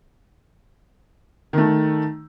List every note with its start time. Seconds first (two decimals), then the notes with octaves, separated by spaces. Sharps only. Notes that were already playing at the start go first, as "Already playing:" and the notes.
1.53 D#3 A3